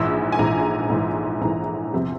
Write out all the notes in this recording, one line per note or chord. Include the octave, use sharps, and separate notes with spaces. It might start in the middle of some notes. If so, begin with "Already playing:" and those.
Already playing: A#1 G#2 E3 E6
G#5
A#1 G#2 E3 A#5
A#1 G#2 E3
A#1 G#2 E3 A#5
E2 C3 F3